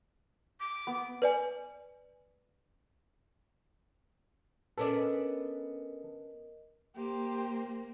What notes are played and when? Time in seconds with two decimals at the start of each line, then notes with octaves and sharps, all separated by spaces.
0.60 D6
0.87 B3
1.22 B4 D5 G#5
4.78 B3 C#4 D4 A4 A#4 D#5
6.96 A#3 G4 C5